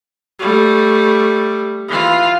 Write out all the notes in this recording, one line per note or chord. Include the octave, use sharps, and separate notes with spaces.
G3 A3
E3 F4